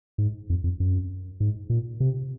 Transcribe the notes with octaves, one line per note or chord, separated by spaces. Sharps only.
G#2
F2
F2
F#2
G#2
A#2
C3